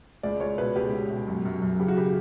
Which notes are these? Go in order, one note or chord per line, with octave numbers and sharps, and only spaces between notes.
C#2 D5
C#2 C#5
B2 B4
C#2 G4
B2
B2
F#2
F#2
F#2
C#3 G4
F#4
C#3 G4